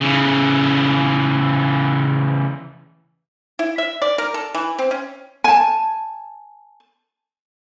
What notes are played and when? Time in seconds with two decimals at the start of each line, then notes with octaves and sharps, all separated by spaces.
0.01 C#3 E3
3.59 E4
3.78 E5
4.02 D5
4.18 A#4
4.34 A4
4.55 E3
4.78 C4
4.91 C#4
5.44 G#5 A5